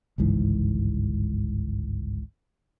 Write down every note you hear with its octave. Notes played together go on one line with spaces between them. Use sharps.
G1 C#2 G#2 E3